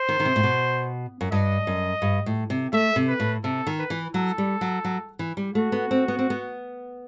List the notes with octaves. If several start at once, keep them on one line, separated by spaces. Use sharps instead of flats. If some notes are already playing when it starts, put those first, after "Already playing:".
Already playing: C5
D#3
D#3
C3
A2
B2
F#2
G2 D#5
F#2
G2
A2
C3
A3 E5
C3
B4
A2
C3 A4
D#3
B4
E3
F#3 A4
G3
F#3
F#3
E3
G3
A3 F#4
B3
C4
B3
C4
B3